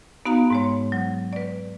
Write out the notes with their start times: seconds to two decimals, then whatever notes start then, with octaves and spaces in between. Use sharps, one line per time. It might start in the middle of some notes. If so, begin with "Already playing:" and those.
0.26 B3 D#4 F#4 F5 A#5
0.50 G#2 G#3 C#5
0.92 F#3
1.33 B4 D5